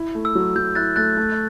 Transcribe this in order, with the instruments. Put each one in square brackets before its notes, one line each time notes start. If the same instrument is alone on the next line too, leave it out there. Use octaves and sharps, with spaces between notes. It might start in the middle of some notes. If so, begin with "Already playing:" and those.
Already playing: [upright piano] E4
A3
[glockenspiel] E6
[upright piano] F#3
[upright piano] F#3 [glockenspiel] G6
[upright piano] E4 [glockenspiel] F#6 A6
[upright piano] A3 [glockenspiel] F#6 A6
[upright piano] A3